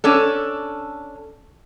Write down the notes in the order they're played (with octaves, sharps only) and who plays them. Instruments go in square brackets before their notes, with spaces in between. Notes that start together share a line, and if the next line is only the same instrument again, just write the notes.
[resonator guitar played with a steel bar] C#4 D4 A4